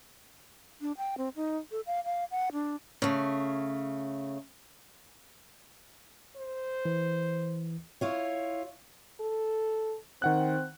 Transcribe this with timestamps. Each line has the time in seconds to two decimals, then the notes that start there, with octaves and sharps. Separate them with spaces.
0.81 D4
0.98 G5
1.18 C4
1.36 D#4
1.72 A4
1.87 F5
2.04 F5
2.31 F#5
2.52 D4
3.02 C#3 A3
6.37 C5
6.85 E3
8.01 E4 F4 C#5
9.20 A4
10.22 D#3 C4 F#5 F#6